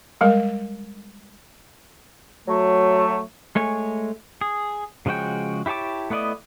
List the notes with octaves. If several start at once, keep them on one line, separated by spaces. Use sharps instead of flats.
G3 G#3 A#4
F#3 A3
G#3 A3 C#5 G#5
G#4
C#3 F3 G#3 F#4 G5
E4 G4 C#5 A5 D6
A3 B3 E4 D5 D#5